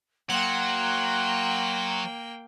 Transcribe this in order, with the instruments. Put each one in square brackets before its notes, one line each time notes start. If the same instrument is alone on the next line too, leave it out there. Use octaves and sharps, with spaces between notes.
[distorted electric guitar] F#3 [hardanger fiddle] A#3 G5 [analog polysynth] F#5 [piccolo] C6